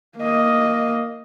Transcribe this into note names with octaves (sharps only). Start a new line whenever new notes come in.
A#3 D#5